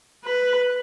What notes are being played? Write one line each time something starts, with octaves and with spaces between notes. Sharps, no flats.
B4